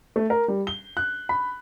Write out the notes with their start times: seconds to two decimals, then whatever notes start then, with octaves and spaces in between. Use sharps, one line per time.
0.16 A3
0.30 A#4
0.48 G3
0.67 G7
0.97 F#6
1.29 B5